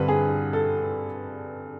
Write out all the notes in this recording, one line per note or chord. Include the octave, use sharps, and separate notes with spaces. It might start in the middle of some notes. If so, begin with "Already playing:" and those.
Already playing: G2 D3 G3 C4 B4
G#4
A4